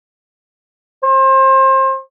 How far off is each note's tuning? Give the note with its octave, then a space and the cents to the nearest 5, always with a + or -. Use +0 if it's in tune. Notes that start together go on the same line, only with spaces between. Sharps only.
C5 +30